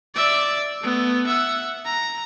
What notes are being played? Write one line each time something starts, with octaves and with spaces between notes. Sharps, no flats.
D5 E5
A3 B3
E5 F#5
A#5